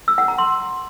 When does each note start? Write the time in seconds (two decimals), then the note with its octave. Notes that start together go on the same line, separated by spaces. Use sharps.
0.08 E6
0.18 F#5
0.28 A#5
0.38 C6